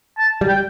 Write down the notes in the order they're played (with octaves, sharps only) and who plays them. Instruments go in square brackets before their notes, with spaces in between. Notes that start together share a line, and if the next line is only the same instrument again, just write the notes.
[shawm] A5
[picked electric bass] G3
[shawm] G5